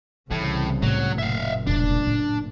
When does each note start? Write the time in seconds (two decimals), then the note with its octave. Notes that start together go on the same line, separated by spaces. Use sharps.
0.31 C2 A2 C#3 E3
0.82 A2 C3 F#3
1.19 F#1 A#2 E5 F5
1.67 E1 G2 D4
2.07 A2